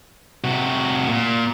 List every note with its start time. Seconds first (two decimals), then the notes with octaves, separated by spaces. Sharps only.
0.44 C3 F#4
1.08 A#2